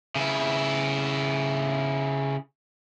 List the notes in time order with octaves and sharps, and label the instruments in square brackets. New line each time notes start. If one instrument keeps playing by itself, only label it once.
[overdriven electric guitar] C#3 E4